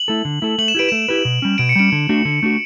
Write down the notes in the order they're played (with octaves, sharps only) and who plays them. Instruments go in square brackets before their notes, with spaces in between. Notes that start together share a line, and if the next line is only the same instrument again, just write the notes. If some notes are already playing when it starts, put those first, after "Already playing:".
Already playing: [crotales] F#7
[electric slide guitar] A3 E4 A4
D3
A3 E4 A4
[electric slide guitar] A3 [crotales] F#7
[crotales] E7
[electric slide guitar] E4 G4 B4 [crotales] D7
[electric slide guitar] A3 [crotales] E7
[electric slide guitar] E4 G4 B4
B2
G3 C#4
[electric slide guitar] B2 [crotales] D7
[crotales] C#7
[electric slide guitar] G3 C#4 [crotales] D7
[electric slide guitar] D3
A3 D4 F#4
D3
A3 D4 F#4